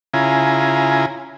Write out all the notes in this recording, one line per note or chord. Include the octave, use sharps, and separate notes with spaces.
C#3 E4 F4 G#5 A#5